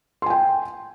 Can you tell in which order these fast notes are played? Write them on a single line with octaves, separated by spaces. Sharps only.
C6 G#5 G5